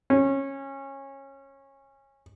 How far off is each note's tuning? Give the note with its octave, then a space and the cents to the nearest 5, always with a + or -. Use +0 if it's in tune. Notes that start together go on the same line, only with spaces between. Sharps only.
C#4 -20